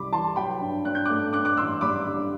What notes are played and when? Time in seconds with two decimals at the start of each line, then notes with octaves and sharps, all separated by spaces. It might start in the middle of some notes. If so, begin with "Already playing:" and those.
Already playing: C2 C3 G3 B5 D6
0.12 E3 A5 C6
0.36 F#3 G5 B5
0.61 G2
0.85 D4 F#6
0.95 G6
1.05 D6 F#6
1.09 A3
1.33 G2 D6 F#6
1.45 D6 F#6
1.57 A1 C6 E6
1.81 G3 B5 D6
2.06 D3